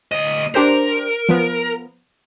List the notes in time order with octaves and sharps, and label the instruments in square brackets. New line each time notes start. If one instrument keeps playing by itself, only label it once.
[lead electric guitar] D2 D#5
[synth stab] D4 G4 C5 [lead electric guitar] A#4
[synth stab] F3 B3